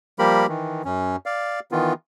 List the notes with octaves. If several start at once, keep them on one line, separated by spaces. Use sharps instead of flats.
F3 G3 A#3 G4 A#4 B5
D#3 E3
F#2 C#4
D5 F5
D#3 E3 B3 F4